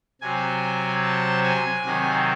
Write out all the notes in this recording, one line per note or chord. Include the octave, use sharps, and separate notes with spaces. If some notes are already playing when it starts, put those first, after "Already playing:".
C3 F#3 C4 G#5
A5
G#5
C3 D#3 F#3 C4